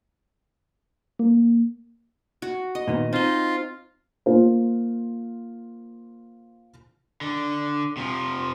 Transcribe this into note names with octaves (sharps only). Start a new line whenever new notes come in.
A#3
F#4
D#5
A#2 D#3 B3
C4 D#4 F4 D#5
A#3 F4 C5
D3
C3 F3